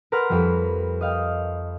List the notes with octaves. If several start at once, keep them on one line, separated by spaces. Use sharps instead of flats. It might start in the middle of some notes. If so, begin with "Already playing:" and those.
A#4 B4 F#5 A#5 C6 F6
F2 G3
D#5 F5 G5